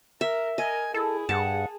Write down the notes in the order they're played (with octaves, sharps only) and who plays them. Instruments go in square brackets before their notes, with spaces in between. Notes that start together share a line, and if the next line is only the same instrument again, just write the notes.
[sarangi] A#4 [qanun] E5
[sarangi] A#4 [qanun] D#5 [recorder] G#5
[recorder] E4 [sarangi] G#4 [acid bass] A4
[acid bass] G2 [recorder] F#5 [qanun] A5